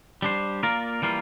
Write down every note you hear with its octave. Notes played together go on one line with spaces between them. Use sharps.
G3 D4 G4 C5
A#3 F4 A#4 D5
E3 G3 A#3 F4